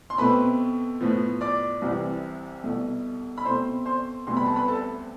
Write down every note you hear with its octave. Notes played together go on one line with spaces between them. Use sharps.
C6
B2 A3 C4 B4 B5
A2 F3 B3
D5 D6
C2 C3 E3
C2 B2 A3
B5
B2 A3 C4 C5 C6
C5 C6
D2 C3 G3 B3 C6
B5
A5
B4 B5
A4 A5